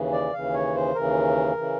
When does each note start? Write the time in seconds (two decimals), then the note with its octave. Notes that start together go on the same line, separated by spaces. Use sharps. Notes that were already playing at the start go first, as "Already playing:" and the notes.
Already playing: D#2 C#3 E3
0.12 D5
0.33 D#2 C#3 E3 F5
0.54 C#5
0.75 C5
0.95 D#2 C#3 E3 A#4
1.57 C#3 E3